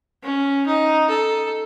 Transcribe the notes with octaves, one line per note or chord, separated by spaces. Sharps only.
C#4
D#4
A4